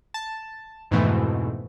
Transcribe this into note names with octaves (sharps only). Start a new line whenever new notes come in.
A5
F2 G#2 B2 E3 A3